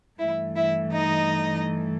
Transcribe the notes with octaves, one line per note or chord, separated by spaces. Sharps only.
G2 E3 A3 E4 E5
E4 E5
D#4 D#5